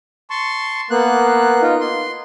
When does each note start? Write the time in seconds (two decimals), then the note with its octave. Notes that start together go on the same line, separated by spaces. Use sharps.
0.30 A5 C6 C#6
0.91 A#3 B3 F#6
1.62 D#4 F4
1.80 C6